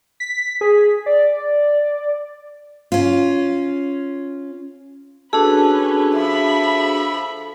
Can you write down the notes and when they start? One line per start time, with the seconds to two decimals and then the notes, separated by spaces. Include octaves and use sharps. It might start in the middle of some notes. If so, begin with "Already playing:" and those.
0.20 B6
0.61 G#4
1.06 D5
2.92 C#4 F4
5.33 C#4 D4 F#4 G#4 A4 B4
6.15 F3 E5 B5